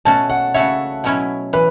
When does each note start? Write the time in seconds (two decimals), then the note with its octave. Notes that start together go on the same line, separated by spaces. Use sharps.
0.05 B2 A3 C#4 F#4 A5
0.30 F#5
0.54 C#3 A3 F#4 C#5 E5
1.04 B2 F#3 C#4 E4
1.53 E3 B4